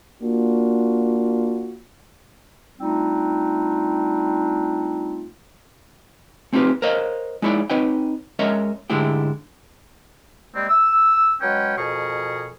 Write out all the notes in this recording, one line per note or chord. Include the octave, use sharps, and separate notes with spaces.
A#3 D4 F4 F#4
G3 A3 C4 D4 D#4 F4
A3 C4 D#4 F4 G4 B4
A#4 C5 C#5 D#5 F5
G#3 D#4 E4 C#5 D5
C4 D#4 B4 C#5 D#5 G5
G#3 C#4 A#4 C#5 D#5 E5
G#2 D3 G#3 A3 E4 G4
G3 G#3 A#3 C4
E6
F#3 G#3 C#4 B4 G5
F2 B2 G#4 A#4 C#6